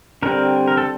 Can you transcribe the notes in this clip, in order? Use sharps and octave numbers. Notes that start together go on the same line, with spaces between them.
D3 G3 C4 A#4
A#4
A4